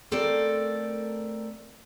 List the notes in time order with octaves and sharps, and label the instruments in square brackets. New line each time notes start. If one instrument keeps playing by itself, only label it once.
[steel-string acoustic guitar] A3 C4 A4 A#4 D5